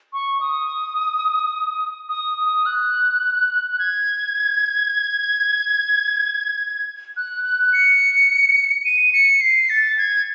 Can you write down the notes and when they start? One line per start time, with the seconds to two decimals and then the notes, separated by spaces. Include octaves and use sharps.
0.13 C#6
0.41 D#6
2.09 D#6
2.38 D#6
2.66 F#6
3.72 F#6
3.79 G#6
7.17 F#6
7.44 F#6
7.73 C#7
8.85 D#7
9.13 C#7
9.41 C7
9.70 A6
9.98 G#6